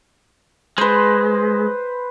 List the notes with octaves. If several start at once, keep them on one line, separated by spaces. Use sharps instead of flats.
G#3 B4 C5